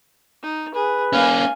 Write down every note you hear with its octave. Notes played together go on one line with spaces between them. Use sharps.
D#4
G#4 B4
A#3 C#4 F5 G#5